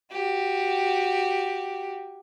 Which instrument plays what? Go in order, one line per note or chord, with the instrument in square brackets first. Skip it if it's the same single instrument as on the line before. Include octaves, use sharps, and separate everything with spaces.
[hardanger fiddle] F#4 G4